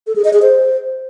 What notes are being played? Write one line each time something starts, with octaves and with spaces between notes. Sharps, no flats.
A4
G#4
D#5
G#4
C5